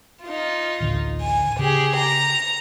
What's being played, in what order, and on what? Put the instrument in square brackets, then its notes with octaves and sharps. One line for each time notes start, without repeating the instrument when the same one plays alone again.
[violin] D#4 F4
[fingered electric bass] A1 D2 D3
[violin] G#5
[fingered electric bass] C#3 [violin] G4 G#4
[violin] A#5